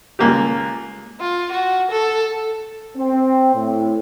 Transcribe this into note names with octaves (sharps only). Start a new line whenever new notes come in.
C#2 A#3 G4
F4
F#4
A4
C4
A2